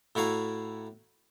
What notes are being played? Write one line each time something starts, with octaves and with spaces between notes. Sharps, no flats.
A2 E4 F#4 F5 A#5